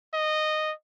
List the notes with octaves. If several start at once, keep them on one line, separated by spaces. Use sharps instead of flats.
D#5